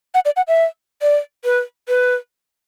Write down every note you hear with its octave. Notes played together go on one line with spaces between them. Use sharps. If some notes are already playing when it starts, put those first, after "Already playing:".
F#5
D5
F#5
E5
D5
B4
B4